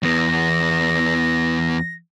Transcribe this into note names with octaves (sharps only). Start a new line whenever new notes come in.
E2 B3 A#6